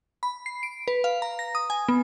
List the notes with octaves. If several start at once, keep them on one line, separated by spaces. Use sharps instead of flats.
B5
C7
D7
B4
F5
A#5
A#6
D#6
G#5
B3